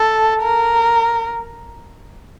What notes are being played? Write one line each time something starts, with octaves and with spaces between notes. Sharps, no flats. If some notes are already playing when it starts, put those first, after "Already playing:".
Already playing: A4
A#4